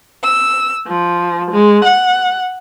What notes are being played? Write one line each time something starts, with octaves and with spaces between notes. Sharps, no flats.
E6
F3
G#3
F#5